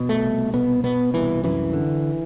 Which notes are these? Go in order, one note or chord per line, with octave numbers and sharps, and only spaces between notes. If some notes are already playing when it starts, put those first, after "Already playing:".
Already playing: B2
A3
C2
B2 B3
B2 B3
C2 E3
F#2 E3
D3